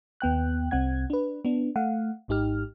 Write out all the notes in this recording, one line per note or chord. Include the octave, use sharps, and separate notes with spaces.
D#2 B3 G5 F#6
C2 C4 F#5 G#6
D4 B4
B3 D4
A3 F5 F#5
G#1 G#2 D#4 G4 F6